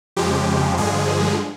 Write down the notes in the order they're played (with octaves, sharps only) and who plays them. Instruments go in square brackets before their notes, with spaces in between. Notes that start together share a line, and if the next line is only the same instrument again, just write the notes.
[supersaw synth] F2 C#3 F3 G#3 G4
G2 D3 F3 G#3 G#4